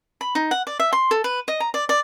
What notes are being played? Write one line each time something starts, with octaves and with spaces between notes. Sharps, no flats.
B5
D#4
F#5
D5
E5
C6
A4
B4
D#5
A#5
D5
D5